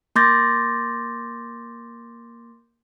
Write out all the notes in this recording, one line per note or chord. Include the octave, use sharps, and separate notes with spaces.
A#3 C6 D6 G6 A6 A#6